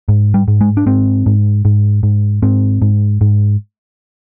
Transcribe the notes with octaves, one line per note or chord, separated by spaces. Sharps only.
G#2
G3
G#2
G#3
D4
G#2 C4
G#2
G#2
G#2
G#2 C4
G#2
G#2